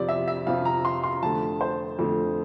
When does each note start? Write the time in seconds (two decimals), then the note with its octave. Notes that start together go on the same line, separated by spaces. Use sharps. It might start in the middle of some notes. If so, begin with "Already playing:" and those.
Already playing: F2 C3 F3 C4 D5
0.09 E5
0.28 E5
0.47 F2 C3 F3 C4 F5
0.65 A#5
0.85 C6
1.04 C6
1.23 F2 D3 A3 A5
1.61 C5
1.99 F2 D3 A3